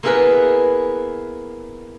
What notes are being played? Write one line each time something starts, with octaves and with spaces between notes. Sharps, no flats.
A#3 B3 E4 G#4 A#4 B4